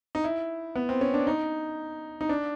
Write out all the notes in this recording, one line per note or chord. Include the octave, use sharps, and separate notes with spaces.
D#4
E4
B3
C4
C#4
D4
D#4
D#4
D4